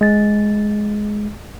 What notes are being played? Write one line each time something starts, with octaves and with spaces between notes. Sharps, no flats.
G#3 A6